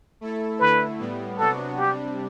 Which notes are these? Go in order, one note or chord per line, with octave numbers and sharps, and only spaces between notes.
A3 E4 A4
D3 A3 E4 B4
A2 G3 B3
C3 F#3 B3 D4 F#4 A4
C3 G3 D4 G4